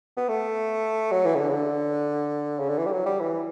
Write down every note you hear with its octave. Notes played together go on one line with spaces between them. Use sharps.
B3
A3
F#3
E3
C#3
D3
C#3
D3
C#3
D3
E3
G3
F#3
G3
E3